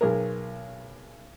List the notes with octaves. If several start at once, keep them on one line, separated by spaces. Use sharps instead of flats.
B1 G#4 A#4